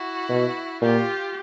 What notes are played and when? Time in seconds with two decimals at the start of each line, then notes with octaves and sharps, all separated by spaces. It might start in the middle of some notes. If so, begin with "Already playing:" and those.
Already playing: E4 F#4
0.29 B2
0.81 A#2 F4 G4